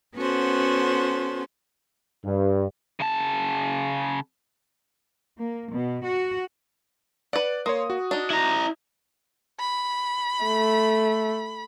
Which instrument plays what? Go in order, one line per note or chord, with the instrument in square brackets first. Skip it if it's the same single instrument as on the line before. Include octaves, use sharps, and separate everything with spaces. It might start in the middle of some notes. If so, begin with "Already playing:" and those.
[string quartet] B3 C#4 F#4 A4 C5
[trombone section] G2
[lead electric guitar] C#3 A5
[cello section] A#3
B2
F#4
[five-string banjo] B4 F#5 [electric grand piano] D5
[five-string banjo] A#3 [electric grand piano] C#5 C6 D#6
[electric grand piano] F#4
[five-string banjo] D4 D#4
[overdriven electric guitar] E4 A#5
[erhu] B5
[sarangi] A3